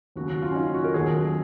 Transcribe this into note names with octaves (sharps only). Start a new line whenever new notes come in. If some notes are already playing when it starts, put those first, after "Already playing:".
D#2 C#3 F#3 F#4
F#4
F4
C#4
D#4
F4
F#4
A#4
D#2 D#3 F#3 G#4